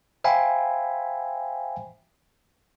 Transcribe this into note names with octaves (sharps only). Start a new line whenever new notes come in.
C5 E5 F5 G5 G#5 B5